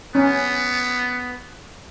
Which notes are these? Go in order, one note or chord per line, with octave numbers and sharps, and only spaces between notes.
B3 C#4